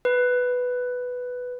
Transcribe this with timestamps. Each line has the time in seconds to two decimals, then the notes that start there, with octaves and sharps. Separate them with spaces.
0.05 B4